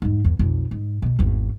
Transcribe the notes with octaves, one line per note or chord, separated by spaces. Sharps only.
E2 G#2
E2
B1 F2
G#2
E2 B2
G#1 E2